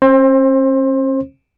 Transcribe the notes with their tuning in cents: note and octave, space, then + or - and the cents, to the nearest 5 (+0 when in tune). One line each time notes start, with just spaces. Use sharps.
C#4 -45 C5 +25